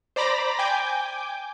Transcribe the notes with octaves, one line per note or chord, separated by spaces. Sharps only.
C5 D5 A#5 B5 D6 A#6
G5 G#5 D6 G6